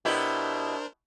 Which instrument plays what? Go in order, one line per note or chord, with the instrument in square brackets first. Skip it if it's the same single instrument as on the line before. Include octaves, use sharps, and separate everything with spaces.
[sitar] B2 E4 G4 [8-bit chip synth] D4 A#4 C5